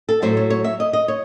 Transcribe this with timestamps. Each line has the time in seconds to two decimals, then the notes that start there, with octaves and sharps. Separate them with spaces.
0.09 A4
0.22 A2 F#3 A3 C5
0.37 C#5
0.50 C#5
0.64 E5
0.80 D#5
0.93 D#5
1.08 C#5